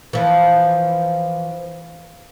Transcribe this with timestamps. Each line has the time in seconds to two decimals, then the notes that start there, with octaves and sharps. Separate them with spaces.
0.13 E3 F3